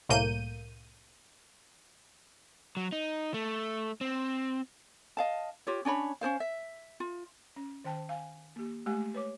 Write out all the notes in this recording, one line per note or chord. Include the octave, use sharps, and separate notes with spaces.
C2 A2 A#3 G6 D#7
F#3
D#4
A3
C4
D#5 F5 A5
F4 G4 C#5
C#4 D4 C#5 B5
C#4 D4 C5 F5
E5
F4
C#4
D#3 C5 G5 A5
F5 G#5
A#3 G4
G#3 A3 G4 G#5
B4 C#5 D6